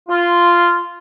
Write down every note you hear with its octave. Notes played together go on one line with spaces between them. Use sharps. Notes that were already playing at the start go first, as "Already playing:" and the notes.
F4